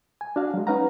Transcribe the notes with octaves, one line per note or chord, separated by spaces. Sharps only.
G#5
D4 F#4 F5
F#3 G#3
C#4 D#4 B4 F5 F#5 A#5